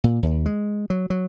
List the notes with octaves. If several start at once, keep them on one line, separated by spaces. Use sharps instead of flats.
A#2
D#2
G#3
F#3
F#3